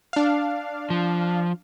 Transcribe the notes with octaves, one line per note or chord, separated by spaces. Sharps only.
D4 F5
F3